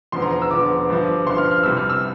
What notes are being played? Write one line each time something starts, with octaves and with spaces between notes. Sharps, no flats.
E1 E2 D3 F3 C6
A#5
A#5
E6
E1 E2 D3 F3 D6
G1 G2 F3
G1 G2 F3 C6
F6
F6
C2 C3 G3 E6
F6
E6